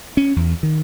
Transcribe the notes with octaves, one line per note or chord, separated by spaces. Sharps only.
C#4
E2
D#3